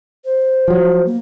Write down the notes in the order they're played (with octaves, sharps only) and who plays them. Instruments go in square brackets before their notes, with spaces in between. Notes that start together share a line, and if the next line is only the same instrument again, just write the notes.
[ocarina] C5
[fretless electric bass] F3 F#3
[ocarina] A#3